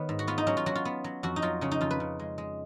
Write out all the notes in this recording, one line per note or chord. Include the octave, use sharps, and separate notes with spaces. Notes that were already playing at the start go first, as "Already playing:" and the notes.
Already playing: D#3 B3 B4 C#5
G#2
F#4
B3 F4
D#4
F#3 C#4
F4
F#3 F#4
F4
B3
F#3
F2 F#4
D#4
F#3 F4
C#3 C#4
D#4
F2 F4
B4
C#3
G#3
G#3